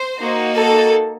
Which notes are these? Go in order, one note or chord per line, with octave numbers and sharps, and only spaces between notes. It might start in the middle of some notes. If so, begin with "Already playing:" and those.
Already playing: C5
A#3 D#4 F#4
A4